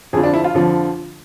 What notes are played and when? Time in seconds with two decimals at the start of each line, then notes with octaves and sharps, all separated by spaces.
0.13 F2 D3 F3 G#4
0.23 D4
0.34 E4
0.44 F4
0.54 F2 D3 F3